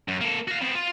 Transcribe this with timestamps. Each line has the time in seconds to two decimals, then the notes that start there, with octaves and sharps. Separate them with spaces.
0.08 F#2
0.21 A#3 A4
0.48 F#4 F5
0.61 B3 C4
0.75 F4